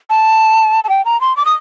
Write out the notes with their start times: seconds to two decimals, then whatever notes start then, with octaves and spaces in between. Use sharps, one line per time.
0.10 A5
0.84 A5
0.89 G5
1.05 A#5
1.21 C6
1.37 D6
1.45 D#6